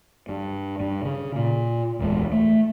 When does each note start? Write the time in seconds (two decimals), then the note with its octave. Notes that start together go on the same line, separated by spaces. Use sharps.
0.29 G2
0.80 G2
1.05 C#3
1.35 A#2
1.99 D1 E2 G#3
2.32 A3